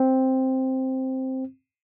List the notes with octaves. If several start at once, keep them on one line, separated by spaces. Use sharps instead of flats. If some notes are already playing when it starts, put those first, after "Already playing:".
Already playing: C4